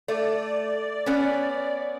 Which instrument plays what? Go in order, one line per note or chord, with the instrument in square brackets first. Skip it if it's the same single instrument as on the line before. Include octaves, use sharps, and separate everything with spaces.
[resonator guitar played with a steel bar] A3 [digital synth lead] D5
[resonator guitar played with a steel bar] B3 C#4